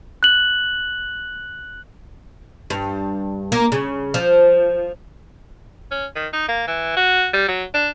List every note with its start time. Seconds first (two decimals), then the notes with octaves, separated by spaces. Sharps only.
0.23 F#6 F#7
2.70 G2
3.52 A#3
3.72 C#3
4.14 F3
5.91 C#4
6.16 D#3
6.33 D#4
6.48 A#3
6.68 E3
6.97 F#4
7.33 G3
7.48 F#3
7.74 D4